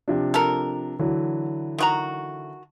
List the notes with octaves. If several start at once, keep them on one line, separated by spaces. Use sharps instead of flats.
C3 F3 D4
A4 A#4
D3 E3 F#3
D#3 F#4 A#5